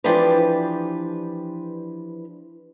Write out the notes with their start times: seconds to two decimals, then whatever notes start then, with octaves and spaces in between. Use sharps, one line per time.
0.04 E3 F3 D4 G4 B4